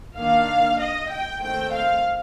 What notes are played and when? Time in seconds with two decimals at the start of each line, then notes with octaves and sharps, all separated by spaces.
0.16 D#3 A#3 D4 F5
0.79 D#5
1.10 G5
1.41 D#3 A3 C4 G5
1.72 F5